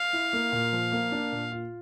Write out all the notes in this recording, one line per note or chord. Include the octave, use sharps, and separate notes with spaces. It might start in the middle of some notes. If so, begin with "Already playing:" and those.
Already playing: F5
E4
A#3
A#2
F3
A#3
D4
A#2
F4